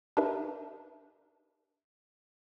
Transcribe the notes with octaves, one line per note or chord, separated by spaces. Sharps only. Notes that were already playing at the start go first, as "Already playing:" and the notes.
D4 D#4 G4 A#4 B4 E5